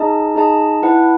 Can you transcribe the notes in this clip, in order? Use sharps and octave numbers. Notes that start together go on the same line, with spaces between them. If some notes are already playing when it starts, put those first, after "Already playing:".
Already playing: D#4 G#4 D#5 A5
D#4 G#4 D#5 A5
E4 B4 F#5 A5